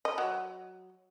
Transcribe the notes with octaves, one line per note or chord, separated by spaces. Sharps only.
D#5
F#3